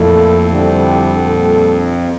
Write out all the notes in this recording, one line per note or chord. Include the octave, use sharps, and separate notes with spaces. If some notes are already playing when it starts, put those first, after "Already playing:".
Already playing: F2 A#2 A3 E4 A4
D3 G3 C4 E4 G4
A#2 G3 D4 A4